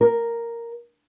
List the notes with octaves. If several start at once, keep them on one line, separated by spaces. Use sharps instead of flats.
A#4